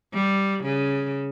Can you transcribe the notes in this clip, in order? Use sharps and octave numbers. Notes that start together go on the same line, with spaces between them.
G3
C#3